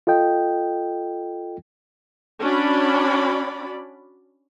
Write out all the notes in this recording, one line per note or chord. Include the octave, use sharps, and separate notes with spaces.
F4 A4 D#5 G5
C#4 D4 F#4 D5 B5